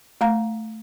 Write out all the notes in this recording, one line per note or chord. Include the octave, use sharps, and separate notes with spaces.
A3 F5 A#5